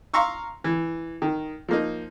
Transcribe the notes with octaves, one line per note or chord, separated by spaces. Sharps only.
F5 A#5 C6 C#6 E6
E3
D#3
F3 A#3 D#4